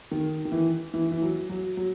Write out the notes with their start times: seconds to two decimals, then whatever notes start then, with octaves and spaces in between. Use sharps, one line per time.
0.11 D#3
0.45 D#3
0.52 E3
0.94 E3
1.12 E3
1.22 F#3
1.49 F#3
1.77 F#3